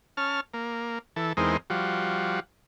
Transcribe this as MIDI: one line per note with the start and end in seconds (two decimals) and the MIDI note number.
0.17 0.40 61
0.17 0.40 81
0.17 0.40 89
0.54 0.99 58
1.16 1.33 52
1.16 1.33 69
1.37 1.57 40
1.37 1.57 56
1.37 1.57 60
1.37 1.57 63
1.37 1.57 70
1.70 2.40 53
1.70 2.40 55
1.70 2.40 66